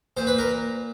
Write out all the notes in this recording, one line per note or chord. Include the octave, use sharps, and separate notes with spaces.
A#2 C5
B4
A#4